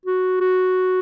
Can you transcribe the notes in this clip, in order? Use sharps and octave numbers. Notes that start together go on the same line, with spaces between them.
F#4
F#4